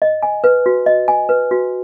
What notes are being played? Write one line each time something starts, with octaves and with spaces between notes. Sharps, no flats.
D#5
G#5
B4
F#4
D#5
G#5
B4
F#4